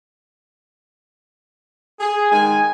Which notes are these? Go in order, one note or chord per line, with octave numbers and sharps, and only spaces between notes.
G#4
D#3 G#3 G#5